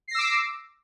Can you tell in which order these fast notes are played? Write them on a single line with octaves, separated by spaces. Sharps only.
C7 A#6 E6 D6